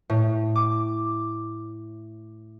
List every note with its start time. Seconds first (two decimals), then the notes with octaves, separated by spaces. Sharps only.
0.10 A2
0.56 D6